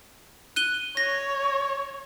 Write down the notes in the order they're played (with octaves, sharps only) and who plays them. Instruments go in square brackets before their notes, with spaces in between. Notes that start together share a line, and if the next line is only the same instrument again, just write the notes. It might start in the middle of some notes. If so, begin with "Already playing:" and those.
[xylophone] F#6 D#7 G7
[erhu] C#5 [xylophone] A#6